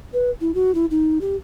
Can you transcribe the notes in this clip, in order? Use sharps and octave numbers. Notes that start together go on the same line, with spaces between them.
B4
E4
F#4
E4
D#4
G4